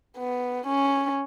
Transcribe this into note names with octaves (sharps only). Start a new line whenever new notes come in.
B3
C#4